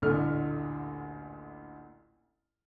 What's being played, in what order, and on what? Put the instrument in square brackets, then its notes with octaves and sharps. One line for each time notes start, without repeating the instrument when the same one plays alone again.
[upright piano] A1 D2 A#2 D3 A3 F6